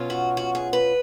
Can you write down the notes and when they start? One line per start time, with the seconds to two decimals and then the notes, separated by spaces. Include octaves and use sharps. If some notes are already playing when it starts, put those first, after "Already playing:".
Already playing: B2 F#3 C#4 F4
0.10 F#4
0.37 F#4
0.55 G#4
0.73 B4